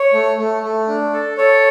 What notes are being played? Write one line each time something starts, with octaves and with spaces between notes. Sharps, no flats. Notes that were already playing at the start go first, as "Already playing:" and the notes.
Already playing: C#5
A3
A3
A3
D4
A4
A4 C#5